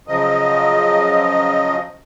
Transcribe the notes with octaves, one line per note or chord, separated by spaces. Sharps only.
C#3 F3 F#3 D#5